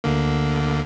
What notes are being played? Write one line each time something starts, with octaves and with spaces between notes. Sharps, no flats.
D2 D3 A#3